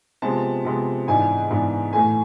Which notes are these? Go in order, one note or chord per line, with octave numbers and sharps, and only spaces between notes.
C3 F3 G#3 B3 A5
C3 F3 G#3 B3
G#2 E3 B3 D4 G#5
G#2 E3 B3 D4
A2 E3 A3 G#5